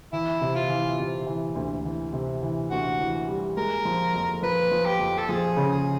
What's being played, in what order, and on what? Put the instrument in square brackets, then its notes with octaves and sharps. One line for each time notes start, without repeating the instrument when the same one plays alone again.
[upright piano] E3 [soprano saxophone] E4
[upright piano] C3
[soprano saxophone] F4
[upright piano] E3
C3
E3
D2
E3
C3
E3
[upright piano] D2 [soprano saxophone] F#4
[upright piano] E3
G3
[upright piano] G#3 [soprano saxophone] A#4
[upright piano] F3
F2
[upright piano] F3 [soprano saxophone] B4
[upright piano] F3
[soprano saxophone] G4
[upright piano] F2
[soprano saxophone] A4
[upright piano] F3 [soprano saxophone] G#4
[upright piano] C#3
[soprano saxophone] G#4